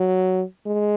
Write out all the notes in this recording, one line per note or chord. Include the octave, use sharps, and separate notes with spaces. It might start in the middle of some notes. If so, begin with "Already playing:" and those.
Already playing: F#3
G#3